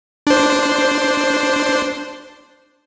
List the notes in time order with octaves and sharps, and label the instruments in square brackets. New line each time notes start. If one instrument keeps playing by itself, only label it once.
[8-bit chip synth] D4 C5